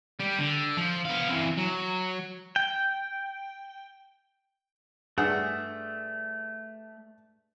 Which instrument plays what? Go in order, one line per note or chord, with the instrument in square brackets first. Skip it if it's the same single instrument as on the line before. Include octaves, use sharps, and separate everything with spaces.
[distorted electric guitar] G3 G4
D3
F3
B3 F5
E3 C4
F#3
[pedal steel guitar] G5
[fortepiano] G2 G#4 F#5 [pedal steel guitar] A3